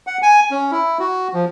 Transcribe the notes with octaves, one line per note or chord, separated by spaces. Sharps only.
F#5
G#5
C#4
E4
F#4
F3